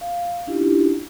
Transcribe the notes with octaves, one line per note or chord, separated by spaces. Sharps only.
F5
C#4 D4 E4 F4 G4